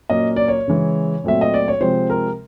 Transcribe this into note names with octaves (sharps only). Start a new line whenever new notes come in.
A#2 F#3 A#3 C#4 D#5
D5
C#5
C#3 E3 G#3
A#2 F#3 A3 C4 E5
D#5
D5
C#5
C3 F3 G#3 C4 C5
A#4